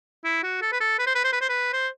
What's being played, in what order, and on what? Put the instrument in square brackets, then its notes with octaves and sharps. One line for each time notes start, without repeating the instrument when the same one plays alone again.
[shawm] E4
F#4
A4
B4
A4
B4
C5
B4
C5
B4
C5
B4
C5